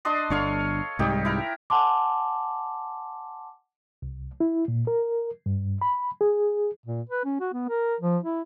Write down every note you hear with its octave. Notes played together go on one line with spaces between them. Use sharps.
D4 D#5 C6
G1 D4 A4 C#5 F5
C2 G#2 G3 D#4 G4
E4 A#4
F#5 G#5 A5 C6 D6
C2
E4
A#2
A#4
G2
B5
G#4
A#2
B4
C#4
F#4
B3
A#4
F3
E4